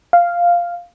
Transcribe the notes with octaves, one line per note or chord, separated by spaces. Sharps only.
F5